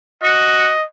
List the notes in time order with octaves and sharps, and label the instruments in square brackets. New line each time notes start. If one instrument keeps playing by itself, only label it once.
[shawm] F#4 [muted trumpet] D#5